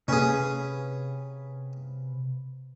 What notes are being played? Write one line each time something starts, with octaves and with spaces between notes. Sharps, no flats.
C3 C#4 G#4 B4 F5